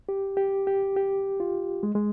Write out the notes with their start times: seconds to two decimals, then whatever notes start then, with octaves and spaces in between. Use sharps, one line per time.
0.09 G4
0.37 G4
0.67 G4
0.96 G4
1.40 F4
1.83 G#3
1.95 G#3